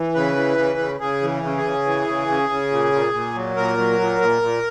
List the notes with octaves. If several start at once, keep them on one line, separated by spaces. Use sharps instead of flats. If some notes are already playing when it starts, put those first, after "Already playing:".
Already playing: E3
C#3 B4
E3
C#3
C#3
C#3 G#4
E3
C#3
G#4
C#3
E3
C#3
C#3
C#3
A#2
A#2
A#2
F#3
A#2 A#4
F#3
A#2
A#2
A#2